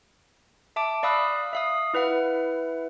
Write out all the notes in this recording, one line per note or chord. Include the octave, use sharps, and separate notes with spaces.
E5 A5 D6 D7
D5 F5 B5 D#6 E6 F#6
E5 F5 D#6
E4 B4 E5 F#5